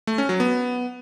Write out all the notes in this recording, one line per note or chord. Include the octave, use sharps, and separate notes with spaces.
A3
C#4
F#3
B3